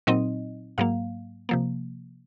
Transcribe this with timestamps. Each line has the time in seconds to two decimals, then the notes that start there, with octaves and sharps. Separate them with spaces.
0.07 A#2 F#3 C4 D#4 D#5
0.78 G#2 F#3 A#3 F5
1.49 C3 F3 A#3